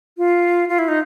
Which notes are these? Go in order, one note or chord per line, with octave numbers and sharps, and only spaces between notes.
F4
F4
E4
D#4